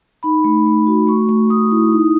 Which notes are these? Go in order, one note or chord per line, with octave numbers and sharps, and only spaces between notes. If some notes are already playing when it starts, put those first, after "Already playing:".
D#4 B5
A3
A3
F#4
A3 C#6
A3
A3 D#6
E4
D#4